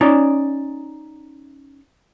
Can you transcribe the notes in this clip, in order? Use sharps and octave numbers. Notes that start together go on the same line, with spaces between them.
C#4 D#4 C#5 D5